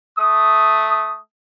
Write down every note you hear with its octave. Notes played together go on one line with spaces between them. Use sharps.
A3 D#6